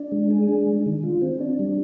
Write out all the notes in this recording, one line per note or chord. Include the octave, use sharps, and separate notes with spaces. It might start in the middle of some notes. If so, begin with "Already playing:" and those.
Already playing: D4
G#3
G#4
D4
G#3
D#3
F4
C4
D4
G3